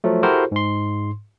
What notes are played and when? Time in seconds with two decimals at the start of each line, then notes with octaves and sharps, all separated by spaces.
0.04 F3 F#3 A3
0.23 E4 F#4 G4 A4 A#4 C5
0.52 G#2 C6